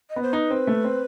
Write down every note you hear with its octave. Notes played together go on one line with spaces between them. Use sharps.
D#5
B3
C5
D#4 B4
C4
A3
C4